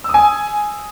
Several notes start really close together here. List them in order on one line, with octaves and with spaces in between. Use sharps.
E6 D#6 G#5